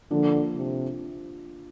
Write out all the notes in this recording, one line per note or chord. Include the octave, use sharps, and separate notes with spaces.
D3 F3 A#3 D4
C3